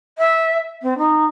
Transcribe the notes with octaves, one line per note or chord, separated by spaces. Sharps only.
E5
C4
D#4